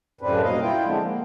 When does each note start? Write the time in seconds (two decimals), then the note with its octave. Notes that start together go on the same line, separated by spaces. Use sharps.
0.21 F#2 A2 C#3 C4 D4 B4
0.42 G2 B2 A#3 D#5 F5
0.61 E4 F4 G5
0.84 D3 F3 G#3 B3 C4 D4
1.02 A#3